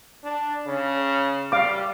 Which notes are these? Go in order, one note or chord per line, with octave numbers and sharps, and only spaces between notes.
D4
C#3
G3 F5 D6